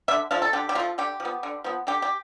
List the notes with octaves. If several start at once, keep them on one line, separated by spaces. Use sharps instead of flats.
D3 E5
F3 A3 F5
A4
D3 G4
G4
F3 A3 F4
D3 G4
F3
B3
D3
F3 B3
D3 G4
G4